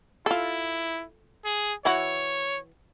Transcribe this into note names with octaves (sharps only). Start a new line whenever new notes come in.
E4 F4 A4
G#4
E3 E4 F#4 C#5